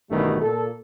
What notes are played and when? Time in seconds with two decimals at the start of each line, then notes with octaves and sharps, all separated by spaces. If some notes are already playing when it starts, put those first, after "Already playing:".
0.11 A1 G2 B2 D#3 G3 A3
0.41 A#2 A4